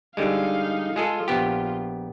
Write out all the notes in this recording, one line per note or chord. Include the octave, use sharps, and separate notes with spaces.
D3 G3 G#3 D#4 F5
G#3 F4 G#4 A4
A#1 B3 G4